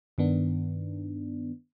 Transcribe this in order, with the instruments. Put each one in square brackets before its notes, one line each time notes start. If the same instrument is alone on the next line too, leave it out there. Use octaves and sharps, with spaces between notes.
[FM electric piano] G2 D#3 B3 D4